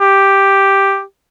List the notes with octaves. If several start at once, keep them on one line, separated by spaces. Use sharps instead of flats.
G4